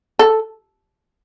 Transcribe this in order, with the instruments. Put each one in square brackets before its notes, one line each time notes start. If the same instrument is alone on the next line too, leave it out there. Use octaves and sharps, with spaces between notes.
[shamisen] A4